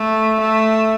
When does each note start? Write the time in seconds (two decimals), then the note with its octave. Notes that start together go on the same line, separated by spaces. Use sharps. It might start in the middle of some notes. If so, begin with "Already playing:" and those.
Already playing: A3
0.40 A3